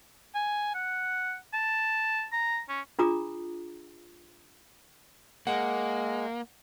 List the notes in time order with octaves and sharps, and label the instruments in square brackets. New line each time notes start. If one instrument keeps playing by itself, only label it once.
[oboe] G#5
F#5
A5
A#5
C#4
[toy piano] D4 F4 G#4 A#5 D6 D#6
[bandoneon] G#3 [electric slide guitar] A#3 [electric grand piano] F#5